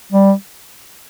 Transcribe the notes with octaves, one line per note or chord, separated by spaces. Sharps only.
G3